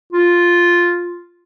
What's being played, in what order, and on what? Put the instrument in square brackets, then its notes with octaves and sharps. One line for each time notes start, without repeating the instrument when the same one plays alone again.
[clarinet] F4